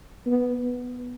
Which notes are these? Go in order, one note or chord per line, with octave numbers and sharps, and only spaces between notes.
B3